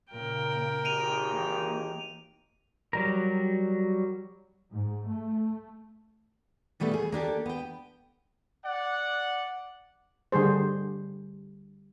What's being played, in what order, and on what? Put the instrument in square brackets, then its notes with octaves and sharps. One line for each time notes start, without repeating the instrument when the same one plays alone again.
[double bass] A#2 C#3 [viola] A#4 G5
[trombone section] G#1 D#4 G4 [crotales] D7 D#7 F7
[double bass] E3 A#3
[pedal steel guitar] F#3 G3 A#4
[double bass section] G#2
A3
[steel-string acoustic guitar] A#2 G3 A3 B3 D#4
G#4
A#3 D4 G4 A4
B3 G5
[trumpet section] D5 F#5
[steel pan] D3 G3 G#4 C5